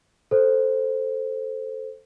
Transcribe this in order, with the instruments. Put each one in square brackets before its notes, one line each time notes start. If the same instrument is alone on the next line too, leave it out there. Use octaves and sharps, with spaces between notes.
[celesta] A4 C5